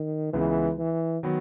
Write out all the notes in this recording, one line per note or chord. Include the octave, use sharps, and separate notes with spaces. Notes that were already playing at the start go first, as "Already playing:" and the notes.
Already playing: D#3
C#2 C#3 E3 G#3 B3
E3
D#3 F#3 B3